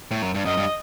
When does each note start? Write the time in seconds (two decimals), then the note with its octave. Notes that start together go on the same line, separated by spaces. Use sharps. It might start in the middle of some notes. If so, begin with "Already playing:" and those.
0.11 A2
0.22 F#2
0.34 G2
0.45 F#2 D#5
0.57 G2